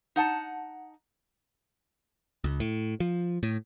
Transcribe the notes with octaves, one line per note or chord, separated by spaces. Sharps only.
D#4 F#5 A5
C#2
A2
F3
A2